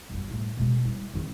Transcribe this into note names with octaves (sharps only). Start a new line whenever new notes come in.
G1 F#2
A2 G3
B2 G#3
G3 E4
D#3 C4